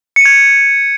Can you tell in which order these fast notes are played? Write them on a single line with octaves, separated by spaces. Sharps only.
C#7 D#7 G#6